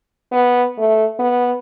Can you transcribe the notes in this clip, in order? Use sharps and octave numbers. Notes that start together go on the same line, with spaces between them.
B3
A3
B3